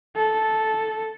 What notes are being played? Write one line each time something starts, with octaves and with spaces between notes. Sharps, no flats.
A4